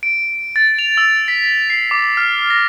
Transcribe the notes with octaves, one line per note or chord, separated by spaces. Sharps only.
D7
A6
F7
E6
B6
C7
D6
F6
A#6